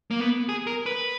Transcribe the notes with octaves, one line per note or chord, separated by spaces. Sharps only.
A#3
B3
G#4
A#4
B4